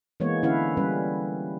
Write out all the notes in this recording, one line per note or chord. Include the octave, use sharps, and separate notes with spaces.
E3 G#3 A#3 B3 C#5
D3 C#4 E4 B4 F5 F#5
G3 C#4 B4